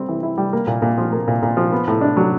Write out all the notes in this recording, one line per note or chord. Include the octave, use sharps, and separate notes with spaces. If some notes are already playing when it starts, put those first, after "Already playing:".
Already playing: G3 C4
E3
E4
G3
A#3
A#2
A#2
F3
A#3
A#2
A#2
F3
B3
A2
D4
F#3